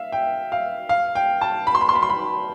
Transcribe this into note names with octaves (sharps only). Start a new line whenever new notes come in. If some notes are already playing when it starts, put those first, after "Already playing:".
Already playing: E5 F5
G5
F5
F5
G5
A5
B5
C6
B5
C6
B5
C6
B5